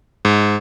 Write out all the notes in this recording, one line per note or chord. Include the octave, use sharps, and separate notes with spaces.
G#2